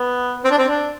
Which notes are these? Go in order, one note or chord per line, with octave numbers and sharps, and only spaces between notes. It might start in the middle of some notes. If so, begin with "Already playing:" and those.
Already playing: B3
C4
D4
C4
D4